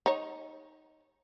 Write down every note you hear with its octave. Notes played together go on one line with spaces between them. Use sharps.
D#4 C#5